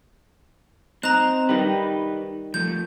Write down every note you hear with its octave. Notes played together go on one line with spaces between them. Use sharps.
C4 D#4 A#5 F#6
D#3 G3 D#4 B4
F3 A3 G6